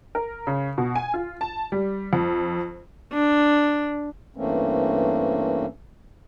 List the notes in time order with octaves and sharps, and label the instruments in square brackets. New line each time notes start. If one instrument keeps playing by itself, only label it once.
[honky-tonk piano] A#4
C#3
B2
G#5
F4
A5
G3
F2
[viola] D4
[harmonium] G2 E3 A3 A#3 C4 C#4